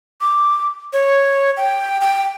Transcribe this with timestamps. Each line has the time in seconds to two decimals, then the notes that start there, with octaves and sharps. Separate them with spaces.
0.21 D6
0.93 C#5
1.57 G5
2.01 G5